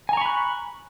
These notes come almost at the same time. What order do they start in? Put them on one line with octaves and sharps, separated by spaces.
G#5 A#5 C#6 B5 F#6